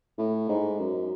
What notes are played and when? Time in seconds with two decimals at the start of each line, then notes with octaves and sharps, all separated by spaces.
0.18 A2
0.49 G#2
0.79 F#2